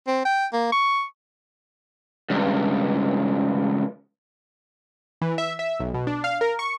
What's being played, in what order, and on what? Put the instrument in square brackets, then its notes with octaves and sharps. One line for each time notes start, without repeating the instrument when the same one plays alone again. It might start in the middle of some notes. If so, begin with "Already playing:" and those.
[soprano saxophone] C4
G5
A#3
C#6
[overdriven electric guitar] C#2 G2
[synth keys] E3
E5
E5
B1
B2
D4
F5
A#4
C#6